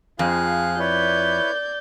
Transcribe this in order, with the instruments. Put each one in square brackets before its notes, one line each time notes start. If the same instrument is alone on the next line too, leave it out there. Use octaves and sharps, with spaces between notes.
[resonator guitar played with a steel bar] F2 [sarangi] F3 [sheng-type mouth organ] G#4 F5 F#6
[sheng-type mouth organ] E4 B4 C#5 [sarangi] D5 [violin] G6